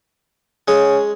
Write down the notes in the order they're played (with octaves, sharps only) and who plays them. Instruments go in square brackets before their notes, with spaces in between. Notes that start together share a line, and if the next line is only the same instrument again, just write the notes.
[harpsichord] G#3 G#4 [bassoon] C#4